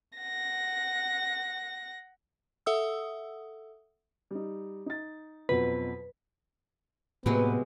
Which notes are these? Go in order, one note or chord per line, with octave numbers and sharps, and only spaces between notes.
F#5 A#6
A4 E5 F#5 D#6 E6
G3 D#4
D#4 A6
F2 B2 F#3 B4
A2 C3 F#3 G#3 A#3 B3 B4